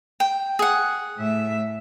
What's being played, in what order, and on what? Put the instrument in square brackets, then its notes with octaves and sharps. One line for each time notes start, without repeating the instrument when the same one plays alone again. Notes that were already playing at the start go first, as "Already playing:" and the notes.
[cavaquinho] G5
G#4 F#5
[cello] A2 E5